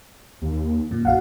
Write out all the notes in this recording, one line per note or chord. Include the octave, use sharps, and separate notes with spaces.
D#2
F#2 A#2
B1 F#4 F5 F#5